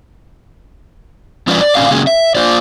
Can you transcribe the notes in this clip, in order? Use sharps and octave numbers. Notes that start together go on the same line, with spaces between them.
F3 G#3 C#4 F4 B4 D5
D5
A#2 D3 G3 C#4 D5 F5
C#3 G#3 A#3 C#4 G#4
E5
A#3 F4 C5 D5